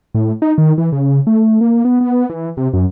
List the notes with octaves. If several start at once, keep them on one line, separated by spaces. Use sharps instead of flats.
A2
D#4
D#3
E3
C#3
A3
A#3
B3
B3
E3
C3
F#2